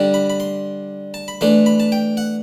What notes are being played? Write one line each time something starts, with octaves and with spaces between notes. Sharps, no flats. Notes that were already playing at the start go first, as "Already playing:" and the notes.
Already playing: D3 G3 D4
B5
B5
C6
A5
B5
E3 A3 D4 C6
B5
A5
G5
F#5